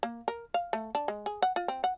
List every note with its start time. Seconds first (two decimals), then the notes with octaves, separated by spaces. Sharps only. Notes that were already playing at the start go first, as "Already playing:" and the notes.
0.03 A#3
0.28 A#4
0.54 F5
0.73 A3
0.95 D4
1.08 G#3
1.26 G#4
1.42 F#5
1.56 F4
1.68 C4
1.84 F#5